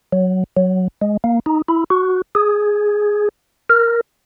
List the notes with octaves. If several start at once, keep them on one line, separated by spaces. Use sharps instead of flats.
F#3
F#3
G#3
A#3
D#4
E4
F#4
G#4
A#4